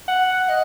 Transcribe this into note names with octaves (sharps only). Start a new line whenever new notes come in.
F#5
D#5